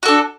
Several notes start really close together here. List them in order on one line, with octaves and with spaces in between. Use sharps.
F#4 A4 D4